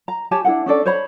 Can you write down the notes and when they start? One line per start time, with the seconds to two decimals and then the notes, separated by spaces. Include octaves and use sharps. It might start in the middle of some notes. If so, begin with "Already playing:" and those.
0.08 A#5
0.31 G4 C#5 G#5 A5
0.45 D4 E4 A#4 F#5
0.66 C#4 D4 A4 D5
0.86 C5 C#5 B5